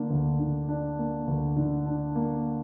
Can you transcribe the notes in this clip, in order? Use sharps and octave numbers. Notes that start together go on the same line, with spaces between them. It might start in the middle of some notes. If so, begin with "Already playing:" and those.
Already playing: D3 A#3 D4
D2
D3
D4
A#3
D2
D3
D4
A#3